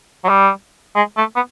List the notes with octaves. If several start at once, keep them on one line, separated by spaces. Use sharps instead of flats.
F#3
G3
G#3
A3
B3